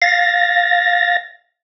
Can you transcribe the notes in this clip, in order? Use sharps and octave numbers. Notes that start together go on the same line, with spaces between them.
F5 A6 A#6